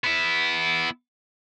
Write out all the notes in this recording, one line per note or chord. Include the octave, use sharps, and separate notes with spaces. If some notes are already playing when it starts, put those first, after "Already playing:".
B3 E4